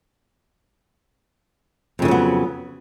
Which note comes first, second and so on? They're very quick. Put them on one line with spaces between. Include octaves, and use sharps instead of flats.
F2 C#3 E3 F#3 B3